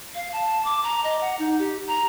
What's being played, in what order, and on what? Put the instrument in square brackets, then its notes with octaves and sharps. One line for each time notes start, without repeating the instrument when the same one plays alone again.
[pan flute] F5
A5
D6
A#5
D#5
F#5
D#4
G4
A#5